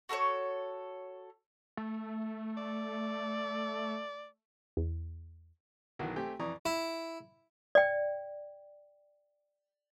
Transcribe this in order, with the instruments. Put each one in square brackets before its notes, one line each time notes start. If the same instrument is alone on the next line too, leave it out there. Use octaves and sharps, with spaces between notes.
[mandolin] F#4 A4 B4 C#5
[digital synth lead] A3
[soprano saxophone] D5
[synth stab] E2
[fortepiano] B1 D#3 E3 F#3 F#5
A3 C4 G4 G5 G#5
F2 E3 D5 A#5 C#6 D#6
[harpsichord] E4
[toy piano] D5 G5